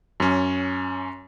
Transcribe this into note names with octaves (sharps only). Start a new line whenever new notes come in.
F#2 C#4